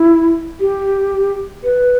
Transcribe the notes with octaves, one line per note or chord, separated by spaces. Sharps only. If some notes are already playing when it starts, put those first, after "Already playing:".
Already playing: E4
G4
B4